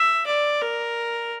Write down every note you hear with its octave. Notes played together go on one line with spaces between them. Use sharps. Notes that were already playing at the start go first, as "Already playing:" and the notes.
Already playing: E5
D5
A#4